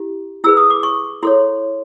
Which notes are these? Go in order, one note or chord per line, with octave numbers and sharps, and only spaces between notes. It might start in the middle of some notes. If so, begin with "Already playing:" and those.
Already playing: E4 G4
E4 G#4 B4 E6
D#6
D6
C#6
E4 A4 C#5 C6